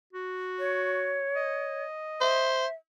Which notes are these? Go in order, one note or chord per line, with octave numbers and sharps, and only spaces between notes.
F#4
C#5
D#5
C5 E5